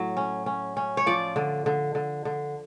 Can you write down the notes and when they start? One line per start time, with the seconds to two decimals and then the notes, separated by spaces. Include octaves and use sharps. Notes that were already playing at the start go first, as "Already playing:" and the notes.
Already playing: A2 F#3
0.17 C#4
0.46 C#4
0.77 C#4
0.97 C#5
1.06 F3 D5
1.36 D3
1.66 D3
1.95 D3
2.25 D3